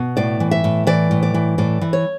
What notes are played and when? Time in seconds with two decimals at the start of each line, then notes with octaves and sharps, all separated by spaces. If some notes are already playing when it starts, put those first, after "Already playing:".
Already playing: B2
0.17 A2 D5
0.40 E3
0.51 E5
0.64 A2
0.87 E3 D5
1.11 A2
1.23 D5
1.34 E3
1.58 A2 D5
1.81 E3
1.93 C#5